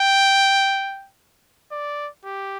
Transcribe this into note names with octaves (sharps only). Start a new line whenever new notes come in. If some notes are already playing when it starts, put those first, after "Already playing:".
Already playing: G5
D5
G4